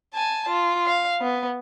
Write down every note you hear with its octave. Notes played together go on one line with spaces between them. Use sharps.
G#5 A5
F4
F5
B3